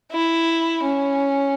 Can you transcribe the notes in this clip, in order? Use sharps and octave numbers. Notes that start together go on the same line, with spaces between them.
E4
C#4